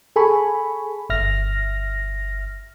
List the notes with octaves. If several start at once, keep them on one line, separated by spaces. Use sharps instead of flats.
G#4 A4 G#5 B5 C#6
G1 E5 F6 A#6